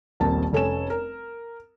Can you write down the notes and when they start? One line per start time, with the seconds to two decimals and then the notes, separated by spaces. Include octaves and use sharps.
0.20 D#1 A#1 A#3 C4 A5
0.53 F1 C#4 A4 C#5 G#5 E7
0.90 A#4